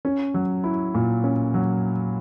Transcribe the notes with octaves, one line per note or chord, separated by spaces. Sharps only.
C#4
F#3
E4
A#2
C#4
F#3